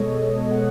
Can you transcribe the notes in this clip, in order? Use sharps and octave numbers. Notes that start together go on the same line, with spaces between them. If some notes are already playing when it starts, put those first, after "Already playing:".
Already playing: B2 G#3 B3 A4 C#5 D#5
F#5